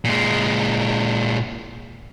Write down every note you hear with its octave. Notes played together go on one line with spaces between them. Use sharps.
A#2 G#3